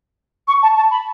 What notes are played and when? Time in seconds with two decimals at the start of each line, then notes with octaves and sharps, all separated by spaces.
0.48 C#6
0.62 A5
0.76 A5
0.91 B5